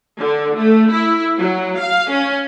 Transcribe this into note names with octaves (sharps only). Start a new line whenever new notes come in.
D3
A3
E4
F#3
F5
C#4